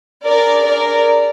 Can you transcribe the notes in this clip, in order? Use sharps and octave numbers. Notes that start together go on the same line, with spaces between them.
D4 G#4 A#4 D5
A#4 D5